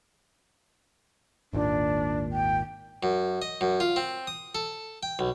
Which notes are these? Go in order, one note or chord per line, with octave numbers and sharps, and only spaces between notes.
G#1 D#2 A#2 D4
G5
F#2
D#5
F#2
F4
C4
D#6
A4
G5
B1